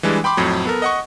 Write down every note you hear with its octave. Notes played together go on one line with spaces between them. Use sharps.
E3 G3 G#3 D4
G5 B5 C6 D6
F2 A2 F#3
B3 A4 A#4
D#5 F#5 C#6